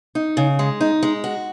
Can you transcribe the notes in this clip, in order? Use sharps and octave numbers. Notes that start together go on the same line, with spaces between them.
D#4
C#3
G#3
D#4
G#3
F#4